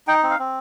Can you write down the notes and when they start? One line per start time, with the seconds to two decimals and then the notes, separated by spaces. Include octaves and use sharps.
0.08 D#4 G5
0.23 C4
0.31 F5
0.39 C4